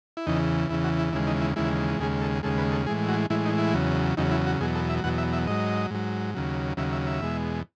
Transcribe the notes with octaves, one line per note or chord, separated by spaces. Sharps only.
E4
E2 C#3 E3 D#4
E2 C#3 E3 E4
F#4
E4
D#2 C#3 E3 G#3 E4
D#4
E4
D#2 C#3 E3 G#3 E4
D#2 C#3 G#3 G#4
A4
D#2 C#3 G#3 A4
B4
A4
A2 E3 G#3 G#4
F#4
A2 E3 G#3 E4
D#4
E4
E2 C#3 F#3
E2 C#3 F#3 D#4
E4
F#4
E2 B2 F#3 G#4
A4
E5
E2 B2 F#3 F#5
E5
E5
G#2 F#3 D#5
G#2 F#3
D#2 C#3 F#3
D#2 C#3 F#3 E5
E5
E5
E2 B2 G#3